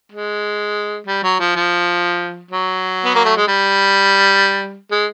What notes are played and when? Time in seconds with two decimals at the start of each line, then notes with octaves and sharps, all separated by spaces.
0.12 G#3
1.07 G3
1.23 F#3
1.40 F3
1.56 F3
2.51 F#3
3.05 B3
3.15 A#3
3.25 A3
3.37 G#3
3.48 G3
4.91 G#3